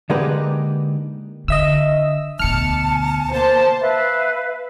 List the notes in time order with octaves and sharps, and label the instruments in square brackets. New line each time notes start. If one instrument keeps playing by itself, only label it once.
[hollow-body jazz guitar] D3 G#3 A#3 D#4 G4 B4
[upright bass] D3 [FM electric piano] D#5 E5 E6
[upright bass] D2 B2 [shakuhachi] A5 [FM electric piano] F6 C#7
[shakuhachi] A#3 [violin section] C5 A5
[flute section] B4 E5 F5